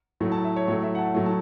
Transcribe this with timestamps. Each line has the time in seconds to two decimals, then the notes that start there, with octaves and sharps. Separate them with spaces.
0.20 A2 F#3 A3
0.32 A5
0.45 E5
0.56 C#5
0.67 A2 F#3 A3 C#5
0.83 E5
0.95 F#5
0.99 A5
1.15 A2 F#3 A3
1.26 A5